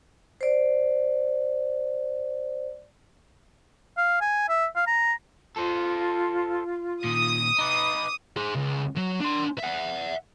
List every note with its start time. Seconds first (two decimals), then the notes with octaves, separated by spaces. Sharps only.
0.41 C5 D5
3.97 F5
4.21 G#5
4.49 E5
4.76 F5
4.87 A#5
5.56 F4 A4 C5
7.04 A#2 D#3 D#6
7.58 D#4 B4 D6
8.36 G#4 C5
8.55 C#2
8.96 F#3
9.20 D4 C6
9.58 E5 F#5